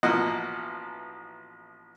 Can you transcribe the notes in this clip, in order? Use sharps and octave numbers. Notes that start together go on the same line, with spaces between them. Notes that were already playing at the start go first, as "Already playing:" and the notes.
A1 B2 F3 A#3 D#5 F#5